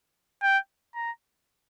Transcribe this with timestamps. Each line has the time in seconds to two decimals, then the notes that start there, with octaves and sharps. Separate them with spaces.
0.42 G5
0.95 A#5